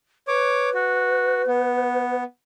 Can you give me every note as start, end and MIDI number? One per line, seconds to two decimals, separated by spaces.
0.28 2.19 71
0.28 0.70 73
0.28 0.70 86
0.74 1.42 66
1.47 2.24 59